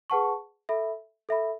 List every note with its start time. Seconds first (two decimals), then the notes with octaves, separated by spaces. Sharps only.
0.10 G#4 B4 F#5 A5 C#6
0.69 A4 E5 B5
1.29 A4 E5 B5